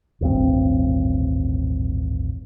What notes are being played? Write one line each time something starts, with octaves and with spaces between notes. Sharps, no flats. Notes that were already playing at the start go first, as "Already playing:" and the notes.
D#1 A1 G2 C4